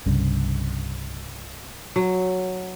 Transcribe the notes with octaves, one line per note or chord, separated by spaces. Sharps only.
C2 G2 C#3
F#3